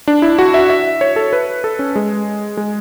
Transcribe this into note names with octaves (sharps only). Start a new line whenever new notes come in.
D4
E4
F#4
E5
E5
C#5
A4
B4
A4
C#4
G#3
G#3